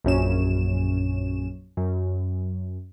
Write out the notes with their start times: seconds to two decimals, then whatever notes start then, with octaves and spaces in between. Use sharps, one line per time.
0.04 A#1 F#2 C#4 E7
1.77 F#2